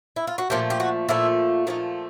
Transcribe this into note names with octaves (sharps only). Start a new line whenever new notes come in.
E4
F4
F#4
A#2 F3 A3 G4
G4
F#4
A#2 F3 A3 E4
A#2 F3 A3 D#4